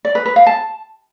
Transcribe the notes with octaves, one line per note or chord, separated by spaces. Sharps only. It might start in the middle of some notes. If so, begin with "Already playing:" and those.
D5
B4
B4
F5
A5